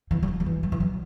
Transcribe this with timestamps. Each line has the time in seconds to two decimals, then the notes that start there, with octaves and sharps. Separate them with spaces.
0.11 E3
0.23 G3
0.28 F#3
0.40 F#3
0.46 E3
0.63 F#3
0.72 E3
0.80 F#3